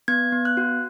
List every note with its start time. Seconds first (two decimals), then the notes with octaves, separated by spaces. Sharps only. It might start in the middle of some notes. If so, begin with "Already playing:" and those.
0.08 B3 G#6
0.32 B3
0.45 F#6
0.57 F#4